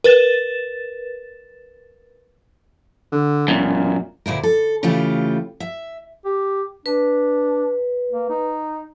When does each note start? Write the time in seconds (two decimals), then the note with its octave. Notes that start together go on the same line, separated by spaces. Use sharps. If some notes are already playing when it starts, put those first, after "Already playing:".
0.04 A#4 B4 A6 E7
3.12 D3
3.48 E1 F#2 A#2
4.26 D2 A#2 E4 A#4
4.43 A4
4.83 C#3 E3 A3 F4 G4
5.60 E5
6.25 G4
6.86 D4 B4
8.11 A#3
8.30 D#4